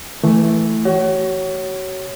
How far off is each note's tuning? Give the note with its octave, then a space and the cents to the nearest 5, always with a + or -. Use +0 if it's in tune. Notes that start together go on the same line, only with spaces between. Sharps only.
E3 +0 A3 +0
F#4 +35 C#5 +0